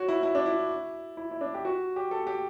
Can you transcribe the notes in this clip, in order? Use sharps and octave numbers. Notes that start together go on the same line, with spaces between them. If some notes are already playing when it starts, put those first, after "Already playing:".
Already playing: F#4 C#5
E4
E4
D4
E4
E4
E4
D4
G4
F#4
G4
A4
G4